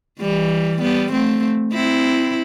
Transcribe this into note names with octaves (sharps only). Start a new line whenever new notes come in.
E3 G3
G3 B3
A3 C4
C4 E4